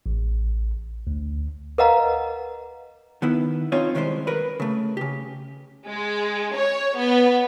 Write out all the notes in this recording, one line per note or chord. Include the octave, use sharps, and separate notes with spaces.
A1
D2
A#4 B4 D#5 F5 F#5 A#5
D#3 B3 E4
C4 C#4 D#4 F4 C#5
D#3 E3 G3 G#3 C5
A#4 B4
C#3 A3
C#3 G4
G#3
C#5
B3